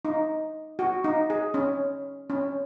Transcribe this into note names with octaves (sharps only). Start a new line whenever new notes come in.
D#4
F#4
D#4
G#4
C#4
C#4